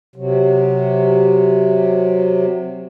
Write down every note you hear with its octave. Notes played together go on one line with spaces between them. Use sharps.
C3 F#3